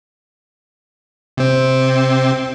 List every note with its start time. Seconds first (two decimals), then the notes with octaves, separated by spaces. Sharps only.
1.37 C3 C4